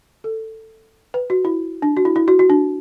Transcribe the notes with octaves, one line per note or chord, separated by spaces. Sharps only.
A4
B4
F#4
E4
D4
F#4
E4
E4
F#4
F#4
D4